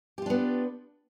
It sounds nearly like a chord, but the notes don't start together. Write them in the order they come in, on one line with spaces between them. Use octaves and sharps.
G4 F4 D4 B3